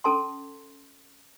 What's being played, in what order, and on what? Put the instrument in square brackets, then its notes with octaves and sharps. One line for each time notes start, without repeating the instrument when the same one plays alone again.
[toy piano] C#4 A4 A5 C6